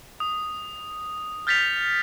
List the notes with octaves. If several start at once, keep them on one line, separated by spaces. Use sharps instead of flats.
D#6
F6 G6 A6 B6 C#7 F7